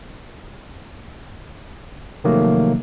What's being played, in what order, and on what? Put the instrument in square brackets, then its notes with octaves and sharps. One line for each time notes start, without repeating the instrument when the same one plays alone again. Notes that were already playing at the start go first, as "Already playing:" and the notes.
[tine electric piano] C3 D#3 F3 F#3 A3 A#3